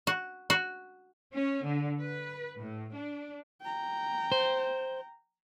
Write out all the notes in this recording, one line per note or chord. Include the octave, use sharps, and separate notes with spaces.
F#4
F#4
C#4
D3
B4
A2
D4
G5 A#5
C5